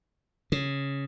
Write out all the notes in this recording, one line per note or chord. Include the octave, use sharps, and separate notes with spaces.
C#3